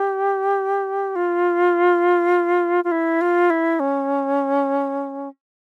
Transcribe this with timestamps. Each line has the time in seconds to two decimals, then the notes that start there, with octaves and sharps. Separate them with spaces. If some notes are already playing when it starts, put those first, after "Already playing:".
Already playing: G4
1.15 F4
2.84 F4
2.91 E4
3.21 F4
3.50 E4
3.80 C#4